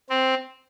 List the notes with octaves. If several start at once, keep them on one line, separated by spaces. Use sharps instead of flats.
C4